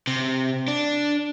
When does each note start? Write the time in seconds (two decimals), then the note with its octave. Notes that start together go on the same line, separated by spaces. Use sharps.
0.07 C3
0.68 D4